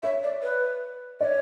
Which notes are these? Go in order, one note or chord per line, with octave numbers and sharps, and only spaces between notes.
C#5 E5
D5
B4
C#5 D5